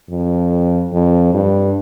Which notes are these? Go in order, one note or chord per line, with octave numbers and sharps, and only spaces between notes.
F2
F2
G2